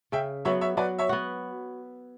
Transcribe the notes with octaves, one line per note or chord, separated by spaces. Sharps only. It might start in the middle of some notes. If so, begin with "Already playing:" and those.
C#3 E5 G5
F#3 B3 C#5 E5
C#5 E5
F#3 B4 D5
C#5 E5
B3 F#4